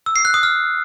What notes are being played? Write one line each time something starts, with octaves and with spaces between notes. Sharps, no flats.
E6
C7
F#6
D#6
F6